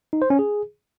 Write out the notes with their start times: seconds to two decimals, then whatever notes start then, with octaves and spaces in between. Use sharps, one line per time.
0.13 D#4
0.22 C5
0.30 C#4
0.39 G#4